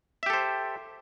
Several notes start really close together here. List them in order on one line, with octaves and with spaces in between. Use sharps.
E5 G4 A4 C5